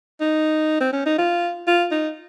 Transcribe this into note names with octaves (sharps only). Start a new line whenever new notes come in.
D#4
C4
C#4
D#4
F4
F4
D#4